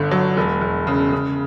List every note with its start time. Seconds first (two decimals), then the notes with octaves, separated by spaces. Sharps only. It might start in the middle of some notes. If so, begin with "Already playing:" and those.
Already playing: G1 D3
0.11 F#3
0.37 E1
0.61 E1
0.87 C#3
1.12 C#3